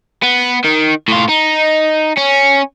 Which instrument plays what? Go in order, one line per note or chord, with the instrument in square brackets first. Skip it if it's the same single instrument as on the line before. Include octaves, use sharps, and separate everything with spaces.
[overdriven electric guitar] B3
D#3
A2 F4
D#4
C#4